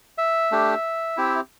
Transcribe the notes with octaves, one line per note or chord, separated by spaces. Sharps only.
E5
A3 D4 G4
C4 E4 G4